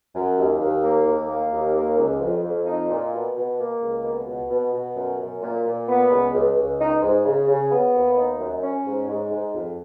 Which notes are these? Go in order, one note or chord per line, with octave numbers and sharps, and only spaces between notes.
F#2
D#2
D#2
A#3
D#2
A#3
D#2
A#3
C#2
F2
F2
D#4
A#2
B2
B2
A#3
C#2
B2
B2
B2
B2
F#2
F#2
A#2
A#2
B3
C#2
C#2
C#2
D#4
G#2
C#3
C#3
B3
D#2
D#4
F#2
C#4
G#2
G#2
G#2
F2